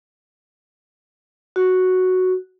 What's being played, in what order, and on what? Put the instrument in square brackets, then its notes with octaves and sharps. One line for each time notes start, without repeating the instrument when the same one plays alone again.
[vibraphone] F#4